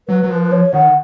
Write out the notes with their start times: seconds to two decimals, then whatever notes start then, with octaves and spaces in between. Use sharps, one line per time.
0.08 F#3 B4
0.23 F#3
0.30 F3 B4
0.43 B4
0.52 C#5
0.73 D#3 F#5